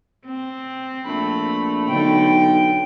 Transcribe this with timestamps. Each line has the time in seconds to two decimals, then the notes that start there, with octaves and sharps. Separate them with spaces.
0.26 C4
1.05 A#1 A3 B5
1.89 B1 D3 G5